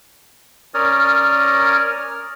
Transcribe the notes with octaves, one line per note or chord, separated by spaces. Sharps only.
C#4 A#4 C#5 D5 D#6 F6